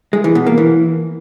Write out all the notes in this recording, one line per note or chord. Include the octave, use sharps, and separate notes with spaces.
G#3
E3
B2
A#3
E3